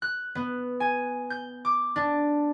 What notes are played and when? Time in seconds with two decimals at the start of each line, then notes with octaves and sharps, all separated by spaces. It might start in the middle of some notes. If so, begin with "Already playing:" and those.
0.02 F#6
0.35 B3
0.80 G#5
1.30 G6
1.65 D6
1.96 D4